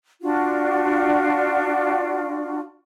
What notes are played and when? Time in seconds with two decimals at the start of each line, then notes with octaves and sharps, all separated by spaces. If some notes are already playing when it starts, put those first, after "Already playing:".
0.22 D4 F4 F#4